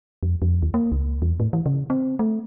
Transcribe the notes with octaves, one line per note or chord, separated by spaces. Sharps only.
F2
F2
D#2
A#3
C#2
E2
A2
E3
C#3
C4
A3